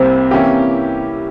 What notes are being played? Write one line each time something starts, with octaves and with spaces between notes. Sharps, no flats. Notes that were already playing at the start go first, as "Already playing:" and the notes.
Already playing: C2 C3 G3 A#3 C4
E3 A#3 C#4 E4 G4